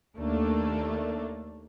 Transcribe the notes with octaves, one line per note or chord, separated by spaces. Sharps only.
D#2 A3 A#3 D4